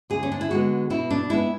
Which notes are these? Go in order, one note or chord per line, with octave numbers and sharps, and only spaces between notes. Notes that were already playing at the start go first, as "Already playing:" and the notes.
D2 G#4
C#4
D4
E4
D3 G#3 B3 F#4
B2 E4
D4
G#3 B3 E4